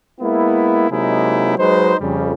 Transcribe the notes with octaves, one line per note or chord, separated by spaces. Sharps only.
G#3 A#3 B3 E4
C3 F#3 G#3 A#3 D#4 E4
F#3 G#3 D#4 B4 C5
F2 C#3 G3